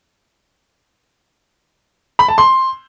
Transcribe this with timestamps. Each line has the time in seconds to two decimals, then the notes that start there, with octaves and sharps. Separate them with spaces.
2.19 B5
2.28 A5
2.38 C6